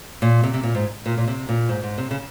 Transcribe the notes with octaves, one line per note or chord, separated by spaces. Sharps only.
A#2
C3
C3
A#2
G#2
A#2
A#2
C3
A#2
G#2
G#2
C3
C#3